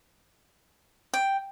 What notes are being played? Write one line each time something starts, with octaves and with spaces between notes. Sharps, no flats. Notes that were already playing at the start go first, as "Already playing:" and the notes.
G5